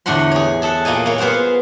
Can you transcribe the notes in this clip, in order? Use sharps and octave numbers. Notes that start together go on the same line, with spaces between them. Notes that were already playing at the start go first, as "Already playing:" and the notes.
E2 A2 D3 F#5 C6
G#4 C#5
G#4 A4 E5 F#5
A#2 A#3 D#5 G#5
A#3 C#5
B3 G#4 C5 F5 F#5